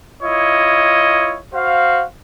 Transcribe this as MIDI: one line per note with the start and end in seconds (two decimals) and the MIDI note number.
0.23 1.37 64
0.23 1.37 65
0.23 1.37 73
0.23 1.37 75
1.54 2.03 66
1.54 2.03 72
1.54 2.03 77